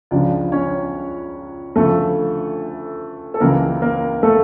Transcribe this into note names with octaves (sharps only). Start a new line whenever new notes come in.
C#2 C#3 F3 D4 D5
C#4 C#5
D2 C#3 F3 A3 A4
A4
C#2 C#3 E3 A#3 A#4
A#3 A#4
A3 A4